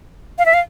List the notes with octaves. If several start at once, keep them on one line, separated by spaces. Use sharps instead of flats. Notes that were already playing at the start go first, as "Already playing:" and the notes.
F5
E5
F5